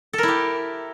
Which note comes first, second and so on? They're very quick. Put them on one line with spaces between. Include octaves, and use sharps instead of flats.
A4 A#4 E4 G4